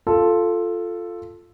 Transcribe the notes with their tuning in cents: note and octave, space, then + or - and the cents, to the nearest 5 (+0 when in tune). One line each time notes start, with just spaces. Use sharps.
F4 +0 A4 +0